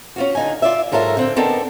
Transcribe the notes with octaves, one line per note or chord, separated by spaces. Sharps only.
C#4 F4 F#4
D3 D#4 G#5
F4 D5 E5
G#2 F#3 F4 A4 A#4 E5
D3 C4 G5
B3 C4 D4 D#4 A4 A#4